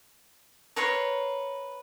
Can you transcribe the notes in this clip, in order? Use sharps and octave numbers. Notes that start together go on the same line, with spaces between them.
A#4 B4 C#5 C6